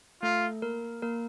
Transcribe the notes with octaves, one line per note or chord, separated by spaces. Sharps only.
A3 F4 A4
A#3 A#4
A#3 A#4